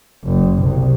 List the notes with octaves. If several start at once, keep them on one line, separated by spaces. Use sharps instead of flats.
F#1
C2